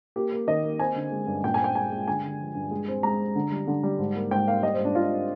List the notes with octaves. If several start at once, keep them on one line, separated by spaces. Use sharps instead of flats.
A#3 G4
A#3
D#3 D#5
A#3
C4 G#5
D3
G#3
G2
A#2 G5
G#5
C4 G5
G#3 G#5
G#3
D3 G#5
D3
F3
G2
G#3
C4
G#3 A#5
C4
D3
G3
D3
G3
G#2
A#3
G#2 G5
A#3 F5
G3 D#5
C5
G#2
D4
G#2 F4
C4